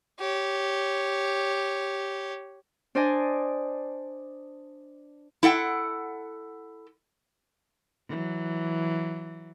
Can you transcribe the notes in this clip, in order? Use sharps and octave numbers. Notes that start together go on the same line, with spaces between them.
G4 C#5
D4 C5 D5 D#5 G#5
E4 A4 F#5 G5
E3 F#3